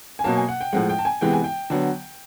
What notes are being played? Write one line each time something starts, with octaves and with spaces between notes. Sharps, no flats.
G#5
B2 F#3 A#3 A5
G#5
F#5
G5
A2 F3 G#3 F#5
G5
A5
G#5
C3 E3 G#3 B3 G5
G#5
G5
D3 F#3 B3